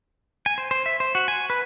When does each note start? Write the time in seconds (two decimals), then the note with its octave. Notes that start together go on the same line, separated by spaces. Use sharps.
0.46 G#5
0.58 C5
0.71 C5
0.86 E5
1.00 C5
1.15 F#4
1.28 G#5
1.50 B4